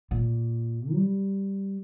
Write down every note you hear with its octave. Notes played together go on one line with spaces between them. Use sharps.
A#2
G3